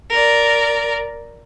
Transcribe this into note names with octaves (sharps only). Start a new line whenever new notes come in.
A#4 D5